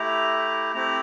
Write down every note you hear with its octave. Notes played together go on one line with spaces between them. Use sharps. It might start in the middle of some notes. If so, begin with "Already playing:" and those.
Already playing: A3 E4 G4 A#5
A3 C4 E4 G4 A#5